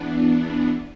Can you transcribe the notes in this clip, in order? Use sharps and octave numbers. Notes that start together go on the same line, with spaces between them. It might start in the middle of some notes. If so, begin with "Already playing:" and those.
Already playing: E2 E3 B3 D4